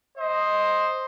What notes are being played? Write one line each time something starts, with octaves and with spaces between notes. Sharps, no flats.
C5 D#5